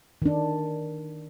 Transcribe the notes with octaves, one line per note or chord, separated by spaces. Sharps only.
D#3 D4